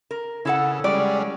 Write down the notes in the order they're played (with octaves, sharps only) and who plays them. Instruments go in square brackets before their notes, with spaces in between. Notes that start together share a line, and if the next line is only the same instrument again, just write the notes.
[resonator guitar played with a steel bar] A#4
[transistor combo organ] C#3 [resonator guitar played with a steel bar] E4 A4 F#5
[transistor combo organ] G3 G#3 C#4 [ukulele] D5